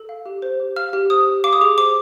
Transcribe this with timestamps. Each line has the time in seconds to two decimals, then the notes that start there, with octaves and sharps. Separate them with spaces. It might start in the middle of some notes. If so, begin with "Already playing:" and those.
Already playing: A4
0.09 F5
0.26 G4
0.42 C5
0.60 G4
0.76 F5 F6
0.93 G4
1.10 C5 D#6
1.27 G4
1.44 F5 D6
1.53 D#6
1.61 G#4 D6
1.77 C5 D6